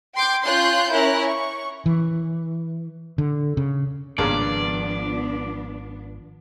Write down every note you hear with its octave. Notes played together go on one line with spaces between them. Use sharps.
G5 C6 D6 G6
C#4 F4 C6 F#6 G6
C#4 E4 A#4 F#6
C#6
E3
D3
C#3
G#1 G2 C#3 F3 A#3 B3 D4 D5